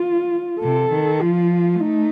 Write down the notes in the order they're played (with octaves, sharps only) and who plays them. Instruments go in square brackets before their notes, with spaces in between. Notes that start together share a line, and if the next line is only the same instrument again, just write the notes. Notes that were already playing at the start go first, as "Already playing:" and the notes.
Already playing: [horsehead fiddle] F4
[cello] C3 [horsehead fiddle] A4
[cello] D#3
[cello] F3 [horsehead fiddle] F4
[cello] A3 [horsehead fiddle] D#4